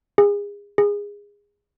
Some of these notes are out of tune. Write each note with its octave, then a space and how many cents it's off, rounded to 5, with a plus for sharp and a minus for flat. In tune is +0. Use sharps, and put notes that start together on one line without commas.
G#4 -30
G#4 -20